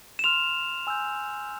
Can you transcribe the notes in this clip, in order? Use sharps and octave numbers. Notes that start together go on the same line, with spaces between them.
E7
C6 F6 F7
G#5 E6 G6